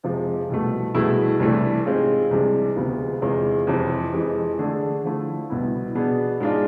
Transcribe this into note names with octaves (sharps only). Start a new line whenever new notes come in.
F2 C3 F3 G#3
C2 B2 A3
C2 B2 A3 E4 G#4
C2 C3 E3 A3 D4
G#2 G#3 C4 F4 G#4
C2 C3 G#3 D4 G#4
D2 C3 G#3 B3 F4
E2 C3 G#3 C4 F4
F2 C3 E3
F2 E3 G#3
D3 A3 D4 G#4
D3 F3 A3 E4
C2 B2 B3 E4
B2 B3 D4 G#4
G#2 G#3 D4 F4